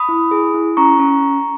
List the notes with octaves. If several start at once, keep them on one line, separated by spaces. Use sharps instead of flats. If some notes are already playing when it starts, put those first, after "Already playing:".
Already playing: B5 D#6
E4
G#4
E4
C#4 A#5 C#6
C#4